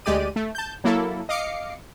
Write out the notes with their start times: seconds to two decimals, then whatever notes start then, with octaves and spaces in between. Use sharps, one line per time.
0.05 D2 G#3 G4 D5 D#7
0.36 A3
0.55 A5 G6
0.84 F#3 A#3 E4 A4
1.29 D#5 F5 D6 C7 C#7